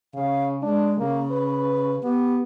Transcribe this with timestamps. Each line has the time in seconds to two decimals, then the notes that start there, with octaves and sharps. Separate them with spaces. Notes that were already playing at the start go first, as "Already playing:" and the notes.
0.15 C#3 F5
0.63 G#3 D4
0.99 C#3 A#3
1.31 B4
2.03 B3 G4